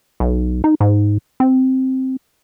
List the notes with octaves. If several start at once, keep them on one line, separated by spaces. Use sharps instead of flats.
B1
D#4
G#2
C4